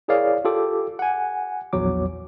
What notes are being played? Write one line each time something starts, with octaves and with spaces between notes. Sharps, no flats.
E4 G#4 A#4 C#5 D5 F5
F4 G4 A4 D6
F#5 G#5
A#1 E2 F#3 D6